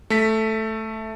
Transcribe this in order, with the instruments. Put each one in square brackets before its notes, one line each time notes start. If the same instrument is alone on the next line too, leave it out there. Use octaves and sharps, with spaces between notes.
[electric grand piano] A3 B6